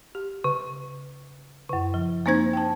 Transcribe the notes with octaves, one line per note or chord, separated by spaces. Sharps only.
G4
C#3
F#2 C#3
F3
A#3 C4 D#4 C5 G#6
G5 A5